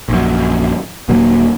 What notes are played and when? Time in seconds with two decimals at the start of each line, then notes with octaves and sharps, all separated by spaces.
0.09 A#1 F#2
1.09 D#1 A#2 F#3 A#3